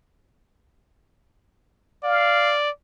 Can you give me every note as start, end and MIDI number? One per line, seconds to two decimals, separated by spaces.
2.04 2.70 74
2.04 2.54 77